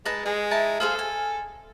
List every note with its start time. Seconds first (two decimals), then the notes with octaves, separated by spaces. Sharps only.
0.05 G#3 D#4 B4 A5
0.26 G#3 G#4
0.51 D#4 E4 A5
0.80 G#4 A4 C5 F5
0.99 G#5